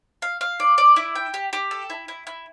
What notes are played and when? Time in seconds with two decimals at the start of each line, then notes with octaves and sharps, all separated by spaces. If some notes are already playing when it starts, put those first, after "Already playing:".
0.22 F5
0.41 F5
0.60 D5
0.78 D5
0.96 E4
1.16 G5
1.34 G4
1.53 G4
1.71 A4
1.90 E4
2.08 E4
2.27 E4